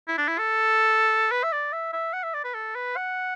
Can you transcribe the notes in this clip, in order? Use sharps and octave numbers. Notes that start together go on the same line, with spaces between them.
E4
D4
E4
A4
B4
E5
D5
E5
E5
F#5
E5
D5
B4
A4
B4
F#5